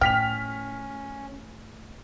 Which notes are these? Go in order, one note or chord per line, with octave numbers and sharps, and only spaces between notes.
A2 C#4 G5 F6 B6 F7